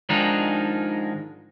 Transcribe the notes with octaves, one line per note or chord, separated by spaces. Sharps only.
G#2 D#3 F3 G#3 D4 D#4